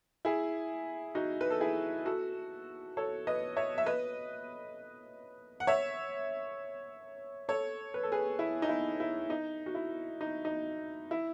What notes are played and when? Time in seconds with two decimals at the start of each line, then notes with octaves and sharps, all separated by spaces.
0.25 E4 G#4
1.15 D#4 F#4
1.41 B4
1.50 A4
1.60 E4 G#4
2.06 F#4 A4
2.97 A4 C#5
3.27 B4 D#5
3.56 C#5 E5
3.78 E5
3.86 B4 D#5
5.60 F#5
5.67 C#5 E5
7.48 A4 C#5
7.94 B4
8.03 A4
8.12 G#4 B4
8.39 E4
8.62 D#4
8.69 E4
9.00 E4
9.30 D#4
9.66 F#4
9.75 E4
10.21 D#4
10.45 D#4
11.11 E4